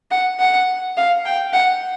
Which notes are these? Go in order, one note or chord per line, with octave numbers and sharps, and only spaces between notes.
F#5
F#5
F5
G5
F#5